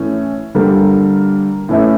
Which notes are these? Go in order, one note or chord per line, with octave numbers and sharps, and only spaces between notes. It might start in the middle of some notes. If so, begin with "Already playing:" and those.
Already playing: A2 E3 A3 C#4
D3 G3 A#3
A2 E3 A3 C#4 E4